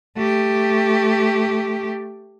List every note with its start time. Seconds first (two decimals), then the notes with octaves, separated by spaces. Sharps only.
0.17 A3 G4